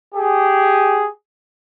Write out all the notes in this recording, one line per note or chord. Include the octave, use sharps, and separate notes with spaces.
G4 G#4